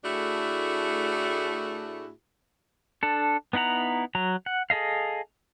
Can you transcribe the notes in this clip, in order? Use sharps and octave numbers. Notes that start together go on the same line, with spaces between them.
A2 A3 D4 E4 F#4 G#4
D4 A4
B3 D#4 E4 F#5 A#5
F#3 A#5
F#5
G#4 A4 D#5 F5